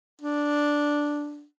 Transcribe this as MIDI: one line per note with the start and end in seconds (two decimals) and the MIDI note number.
0.21 1.45 62